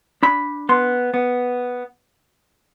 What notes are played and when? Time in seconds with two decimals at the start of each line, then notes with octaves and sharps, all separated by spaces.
0.23 D4 B5
0.69 B3 C6
1.14 B3